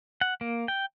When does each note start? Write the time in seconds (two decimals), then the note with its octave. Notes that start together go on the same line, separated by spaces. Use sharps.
0.21 F#5
0.41 A#3
0.68 G5